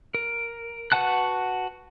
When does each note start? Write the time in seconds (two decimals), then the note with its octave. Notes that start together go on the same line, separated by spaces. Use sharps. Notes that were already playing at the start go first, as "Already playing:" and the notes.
0.15 A#4
0.92 F#4 B4 F#5 A5 F#6